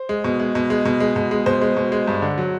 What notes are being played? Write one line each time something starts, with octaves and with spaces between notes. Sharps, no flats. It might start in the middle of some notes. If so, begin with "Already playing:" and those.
Already playing: C5
G#3
B2
G#3
B2
G#3
B2
G#3
B2
G#3
B2 C5
G#3
B2
G#3
G2
D3
F#3